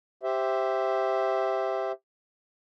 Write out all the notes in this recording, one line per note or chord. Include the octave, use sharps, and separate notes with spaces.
G4 C5 E5